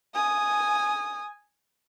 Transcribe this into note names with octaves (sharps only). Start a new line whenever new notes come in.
G#5 D#6